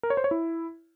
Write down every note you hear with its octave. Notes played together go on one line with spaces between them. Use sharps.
A#4
C#5
C5
C#5
E4